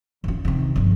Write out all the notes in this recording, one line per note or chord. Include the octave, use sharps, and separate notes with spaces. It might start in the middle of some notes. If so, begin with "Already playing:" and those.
F#2 F4
C3 D#3
G1 F3